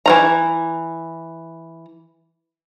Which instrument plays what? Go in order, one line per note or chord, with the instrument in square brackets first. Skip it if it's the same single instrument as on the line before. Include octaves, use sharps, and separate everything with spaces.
[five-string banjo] E3 F3 A#5